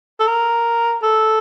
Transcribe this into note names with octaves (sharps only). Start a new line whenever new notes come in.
A4
A#4
A4